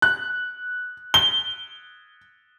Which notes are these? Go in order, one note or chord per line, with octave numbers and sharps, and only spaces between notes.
F#6
G7